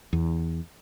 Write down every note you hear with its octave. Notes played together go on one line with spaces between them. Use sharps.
E2